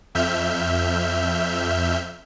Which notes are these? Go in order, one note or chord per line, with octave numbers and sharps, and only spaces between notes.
F2 E5 F6 G6